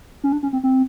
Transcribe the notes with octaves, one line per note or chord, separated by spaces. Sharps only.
C#4
D4
C#4
C4
C4